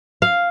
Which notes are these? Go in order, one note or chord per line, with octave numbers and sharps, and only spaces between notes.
F5